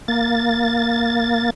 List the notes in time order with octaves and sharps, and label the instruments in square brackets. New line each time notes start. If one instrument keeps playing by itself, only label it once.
[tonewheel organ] A#3 A6